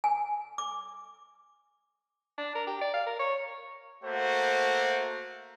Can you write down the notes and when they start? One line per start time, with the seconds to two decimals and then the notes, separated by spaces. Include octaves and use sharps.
0.04 G#5
0.58 D6
2.38 D4
2.55 A#4
2.67 G4
2.82 D5
2.94 F5
3.07 A#4
3.19 C#5
4.03 A3 A#3 F#4 C5